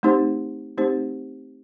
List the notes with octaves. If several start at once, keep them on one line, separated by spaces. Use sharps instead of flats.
A3 C4 D#4 G4 C5
A3 C4 D#4 G4 C5